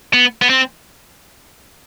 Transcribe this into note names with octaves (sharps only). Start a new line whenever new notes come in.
B3
B3
C4